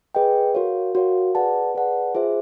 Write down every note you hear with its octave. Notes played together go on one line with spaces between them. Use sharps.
G#4 B4 D#5 G5
F#4 A#4 C#5 F5
F#4 A#4 C#5 F5
G#4 B4 D5 F#5 A5
G#4 B4 D5 F#5 A5
F4 G#4 C5 E5